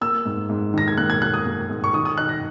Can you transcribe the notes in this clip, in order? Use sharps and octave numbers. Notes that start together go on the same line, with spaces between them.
A#3 E6
G#2
G#2
D#3 A#6
G#6
A#3 F#6
G#6
A#3 F#6
D#6
A#3
G#2
C#6
D#3 D#6
D#6
D#4 F#6
A#6